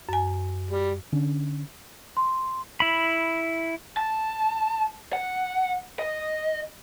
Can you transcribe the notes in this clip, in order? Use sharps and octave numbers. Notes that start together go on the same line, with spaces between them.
F#2 G#5
G3
D3 C#4 D4
C6
E4 B5
A5
F#5
D#5